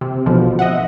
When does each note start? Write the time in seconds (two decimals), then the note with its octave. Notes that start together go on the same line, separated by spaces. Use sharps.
0.01 C3
0.26 A1 D2 B2 F3
0.59 D#5 E5 F#5